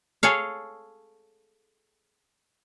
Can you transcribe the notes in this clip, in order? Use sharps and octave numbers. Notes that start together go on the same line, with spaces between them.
G#4 A4 C#5 F5